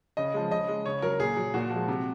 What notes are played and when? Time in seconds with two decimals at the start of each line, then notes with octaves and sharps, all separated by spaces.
0.17 C#3 D#5
0.34 F3 G#3
0.51 C#3 D#5
0.68 G#3
0.86 C#3 C#5
1.02 F#3 A#4
1.20 A#2 G#4
1.36 F#3
1.54 A#2 F#4
1.70 F3
1.76 G#3
1.88 C3